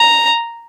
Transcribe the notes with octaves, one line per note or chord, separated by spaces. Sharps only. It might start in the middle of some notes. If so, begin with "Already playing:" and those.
Already playing: A#5